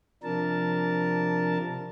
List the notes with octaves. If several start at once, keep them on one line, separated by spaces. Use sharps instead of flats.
C3 F3 D4 A#4 A5